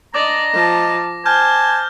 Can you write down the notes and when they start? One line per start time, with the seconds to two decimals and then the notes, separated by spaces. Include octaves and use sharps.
0.14 D4 D5 D#5 A#5 D6 A#6
0.53 F3 D#5 A5
1.26 C5 G#5 A5 F6 G6